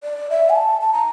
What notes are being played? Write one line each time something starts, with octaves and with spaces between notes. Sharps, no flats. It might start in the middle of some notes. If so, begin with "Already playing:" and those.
D5
E5
G#5
A5
A5
A#5